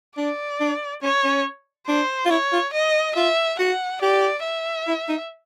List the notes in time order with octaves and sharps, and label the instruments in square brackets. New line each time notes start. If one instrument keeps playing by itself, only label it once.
[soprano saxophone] D4 [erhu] D5
[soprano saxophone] D4
[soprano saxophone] C#4 [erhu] C#5
[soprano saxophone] C#4
[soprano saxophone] D4 [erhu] C5
[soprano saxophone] F4
[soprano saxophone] E4 [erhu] C#5
[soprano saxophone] F4
[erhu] D#5
[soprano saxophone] F4 [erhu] E5
[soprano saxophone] F#4 [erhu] F#5
[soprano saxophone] G4 [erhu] D5
[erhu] E5
[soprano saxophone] E4
D#4